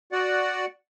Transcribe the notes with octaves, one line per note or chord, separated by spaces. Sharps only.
F#4 D5 F#5